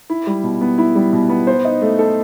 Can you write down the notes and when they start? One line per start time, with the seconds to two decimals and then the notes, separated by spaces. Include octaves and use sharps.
0.10 E4
0.27 G3
0.44 B2
0.61 B3
0.78 E4
0.95 G3
1.13 B2
1.29 B3
1.47 C5
1.65 D#4
1.82 A3
1.99 A4